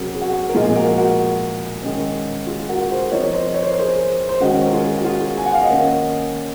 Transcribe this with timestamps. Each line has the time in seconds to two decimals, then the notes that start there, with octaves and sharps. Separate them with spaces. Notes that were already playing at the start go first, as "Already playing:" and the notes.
Already playing: C3 F#3 C#4 F#4 G#4 A#4
0.14 G#4
0.22 F#4
0.49 A#4
0.54 A#2 F3 G#3 D#4 F4 G#4
0.75 F#4 A#4
0.98 F#4 A#4
1.83 D#3 G#3 C#4
2.47 F4 G#4
2.69 F#4 A#4
2.90 G#4 C5
3.11 F3 C4 D#4 A#4 C#5
3.33 C5 D#5
3.54 C#5
3.63 C5
3.71 A#4
3.79 G#4 C5
4.29 C5
4.40 D#3 G#3 C#4 F#4 A#4
4.66 A#4
4.73 F4 G#4
4.97 F#4
5.05 F4 G#4
5.38 G#5
5.46 F#5
5.53 F5
5.61 D#5 F#5
5.70 D#3 A#3 C#4